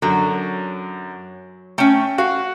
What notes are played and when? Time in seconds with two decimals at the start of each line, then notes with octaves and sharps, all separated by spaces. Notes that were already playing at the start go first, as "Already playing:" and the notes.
0.02 F#2 D3 F#3
1.78 A3 C#4 G5
2.18 F#4 F5